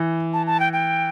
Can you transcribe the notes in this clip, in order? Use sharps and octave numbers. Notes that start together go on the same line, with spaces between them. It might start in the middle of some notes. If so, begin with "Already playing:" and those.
Already playing: E3
A5
A5
G5
G5